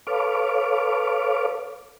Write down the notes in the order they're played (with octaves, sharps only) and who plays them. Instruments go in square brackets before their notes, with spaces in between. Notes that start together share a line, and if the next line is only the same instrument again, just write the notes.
[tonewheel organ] A4 B4 C#5 F5 D6